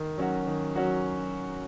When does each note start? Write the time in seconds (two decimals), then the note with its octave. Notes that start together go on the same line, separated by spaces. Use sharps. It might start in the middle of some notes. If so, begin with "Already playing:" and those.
Already playing: D#3
0.18 F#3 C#4 F#4
0.47 D#3
0.75 F#3 C#4 F#4